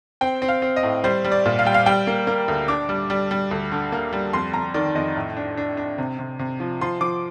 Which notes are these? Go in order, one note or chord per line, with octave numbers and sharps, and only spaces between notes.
C4 G5
C4
F5
C4
D#5
A2
G3 C5
G3
D5
A#2
F5
G3 G5
F5
G3 G5
A#3
A#3
D2
D4 D6
G3
G3
G3
D2
D3
A#3
G3
F2 C6
F2 A#5
D#3 D5
F2 D#5
A2
D4
D4
D4
C3
C3
C3
F3
F3 C6
F3 D6